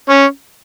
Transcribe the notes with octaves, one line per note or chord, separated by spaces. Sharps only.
C#4